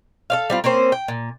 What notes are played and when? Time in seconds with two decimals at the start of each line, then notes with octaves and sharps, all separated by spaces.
0.30 A4 D5 F5
0.50 G3 C4 F4
0.64 A#3 C4 C#4 C5
0.92 G5
1.08 A#2